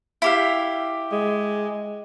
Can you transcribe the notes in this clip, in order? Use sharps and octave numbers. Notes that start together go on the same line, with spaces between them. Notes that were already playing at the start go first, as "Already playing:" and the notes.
E4 G4 F5
G#3